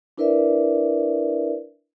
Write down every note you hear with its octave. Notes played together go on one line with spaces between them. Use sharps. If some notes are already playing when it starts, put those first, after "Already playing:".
D4 E4 A#4 B4 D5 E5